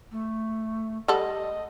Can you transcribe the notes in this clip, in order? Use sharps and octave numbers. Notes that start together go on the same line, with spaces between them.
A3
G3 A4 D#5 F#5